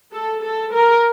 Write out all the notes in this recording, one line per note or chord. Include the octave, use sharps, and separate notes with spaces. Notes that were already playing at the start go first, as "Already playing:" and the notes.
A4
A4
A#4